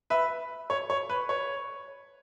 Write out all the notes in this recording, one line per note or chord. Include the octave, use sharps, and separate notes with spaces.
B4 E5
C#5
C#5
B4
C#5